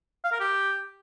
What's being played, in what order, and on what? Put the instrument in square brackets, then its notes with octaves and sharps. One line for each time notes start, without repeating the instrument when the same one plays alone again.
[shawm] F5
A#4
G4